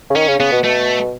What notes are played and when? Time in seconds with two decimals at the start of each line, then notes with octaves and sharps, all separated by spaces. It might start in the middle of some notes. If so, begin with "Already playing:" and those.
0.10 C#3
0.16 D#3 C#4
0.28 C#3
0.39 C#3 B3
0.52 B2
0.64 B2 A3